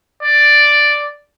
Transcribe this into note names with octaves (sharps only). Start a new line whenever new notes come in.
D5